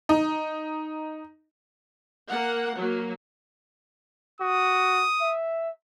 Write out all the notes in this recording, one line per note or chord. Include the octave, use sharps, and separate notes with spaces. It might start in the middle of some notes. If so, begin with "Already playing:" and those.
D#4
A#3 F#5
F#3 A#3
F#4 D#6
E5